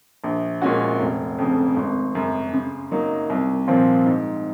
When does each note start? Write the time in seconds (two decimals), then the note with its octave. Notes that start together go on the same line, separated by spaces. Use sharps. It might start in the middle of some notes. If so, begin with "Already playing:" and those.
0.24 A#1
0.62 A#2 G#3 C#4 F#4
1.00 F1
1.38 F2 C#3
1.76 G#1
2.15 F#2 C#3
2.53 C#3
2.91 F#3 A#3 D#4
3.30 C2
3.67 A#2 F3 C4 F4
4.06 G#2